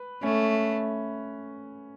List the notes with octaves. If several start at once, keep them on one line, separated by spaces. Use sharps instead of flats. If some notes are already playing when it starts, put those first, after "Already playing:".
Already playing: B4
A3 C#4